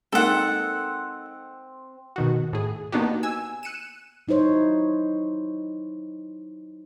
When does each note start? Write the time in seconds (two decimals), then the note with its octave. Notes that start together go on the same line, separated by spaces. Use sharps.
0.12 G#3 A#3 C4 D#4 A4 F#5
2.16 B2 D#3 F#4
2.53 A2 G#4
2.92 A#3 B3 D4 D#4 F#4 G4
3.23 G#5 E6
3.63 F#6 C#7 D#7 E7
4.28 F#3 D#4 E4 C5 C#5